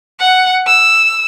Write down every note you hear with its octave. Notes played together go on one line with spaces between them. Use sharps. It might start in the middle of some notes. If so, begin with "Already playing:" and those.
F#5
E6